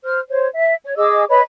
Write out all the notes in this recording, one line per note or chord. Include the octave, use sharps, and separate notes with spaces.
C5 F6
C5 C#5
E5
C#5
G#4 D#5 D6 E6
B4 C#5 D#5 B5